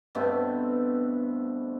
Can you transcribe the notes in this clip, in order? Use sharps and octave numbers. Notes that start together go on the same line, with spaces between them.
G2 B2 A3 C4